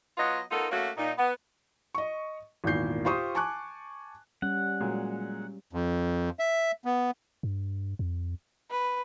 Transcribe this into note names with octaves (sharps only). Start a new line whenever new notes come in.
F#3 B3 F4 D#5
B3 D#4 F4 A4 A#4
A3 A#3 C#4 F#4
A#2 D#4
B3
D#5 C#6
G#1 E2 A#2 D#3 G6 C7
F4 G4 C5 C6 C#6 D#6
G#5 A5 C#6 D6 F#6
G3 C#4 F#5
A#2 F#3 G#3
F2
E5
B3
G2
F2
B4